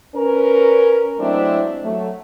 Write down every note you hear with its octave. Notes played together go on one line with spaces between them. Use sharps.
C#4 A#4 B4
F#3 G#3 A3 C4 D4 E4
F#3 A3